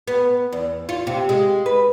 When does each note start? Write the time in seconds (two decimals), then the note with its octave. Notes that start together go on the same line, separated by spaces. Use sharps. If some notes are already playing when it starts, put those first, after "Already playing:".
0.08 B3
0.52 E2
0.89 F4
1.07 C3
1.29 G#3
1.66 B4